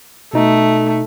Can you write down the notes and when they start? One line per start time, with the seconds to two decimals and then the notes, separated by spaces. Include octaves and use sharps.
0.33 B2 A3 D#4